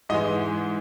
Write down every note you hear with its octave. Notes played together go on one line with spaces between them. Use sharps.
G#2 E3 G#3 D#5